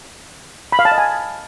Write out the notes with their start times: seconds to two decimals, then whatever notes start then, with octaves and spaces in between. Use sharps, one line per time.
0.72 B5
0.79 F5
0.85 A5
0.92 D#5
0.98 G#5